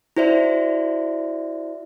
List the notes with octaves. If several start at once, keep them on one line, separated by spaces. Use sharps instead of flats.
E4 F#4 C5 D5 E5